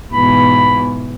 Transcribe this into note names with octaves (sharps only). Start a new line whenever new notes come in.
G#2 B2 E3 B5